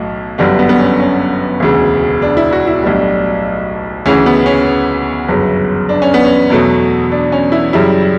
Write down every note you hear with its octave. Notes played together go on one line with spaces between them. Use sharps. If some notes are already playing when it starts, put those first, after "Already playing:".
Already playing: B1 A2
G1 F#2 D3 G3 D4
B3
B3
C#4
C#4
E1 D2 C#3
D4
E4
F#4
E4
B1 A2 G3 D4
D2 C#3 E3 C#4
B3
C#4
B3
G1 F#2 C#3
D4
C#4
B3
C#4
E2 B2 F#3 A3
D4
C#4
E4
F#2 C#3 G3 E4